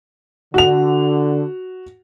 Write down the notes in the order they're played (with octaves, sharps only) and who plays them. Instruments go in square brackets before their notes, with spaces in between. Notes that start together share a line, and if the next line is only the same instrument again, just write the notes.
[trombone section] D3 [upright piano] F#4 F7